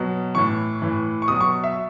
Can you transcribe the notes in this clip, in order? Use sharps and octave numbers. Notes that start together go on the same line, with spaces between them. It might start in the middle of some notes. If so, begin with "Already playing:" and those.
Already playing: B2 F#3
A2 E3 C#6
A2 E3
C#6
B2 F#3 D#6
C#6
E5